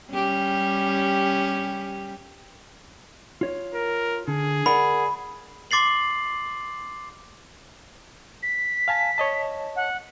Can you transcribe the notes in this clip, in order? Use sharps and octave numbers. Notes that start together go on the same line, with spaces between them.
G3 C#4 G4
F4 C#5
A#4
D3 G#4
A#4 D5 F#5 B5
C6 D6 A6 C7 F#7
B6
F5 G#5 A5
C#5 D#5 A5
F#5